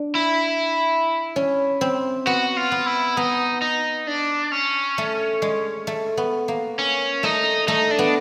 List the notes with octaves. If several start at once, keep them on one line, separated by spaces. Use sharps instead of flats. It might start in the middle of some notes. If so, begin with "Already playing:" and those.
Already playing: D4
E4
C#4
C4
B3 F#4
F4
B3
E4
B3 D#4
D#4
D4
C#4
A3
G#3
A3
B3
A#3
C#4
A3 D#4
A3 D#4
D4
B3